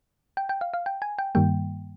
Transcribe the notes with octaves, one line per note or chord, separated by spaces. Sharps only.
G5
G5
F5
F5
G5
G#5
G5
G2 D#3 G3 A#3 G5